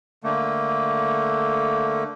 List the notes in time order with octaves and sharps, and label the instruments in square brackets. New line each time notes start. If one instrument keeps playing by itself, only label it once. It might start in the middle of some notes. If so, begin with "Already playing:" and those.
[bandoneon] D3 A3 A#3